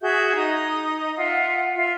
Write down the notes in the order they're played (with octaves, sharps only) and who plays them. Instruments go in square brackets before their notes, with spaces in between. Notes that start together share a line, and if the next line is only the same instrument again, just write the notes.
[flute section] F#4 G#4 E5 G6
D#4 D#5 D#6
F4 E5 F#5
F4 E5